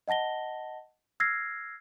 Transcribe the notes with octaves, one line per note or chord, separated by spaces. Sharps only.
D#5 F#5 A5 A#6 G7
E6 F6 G#6 A#6 C7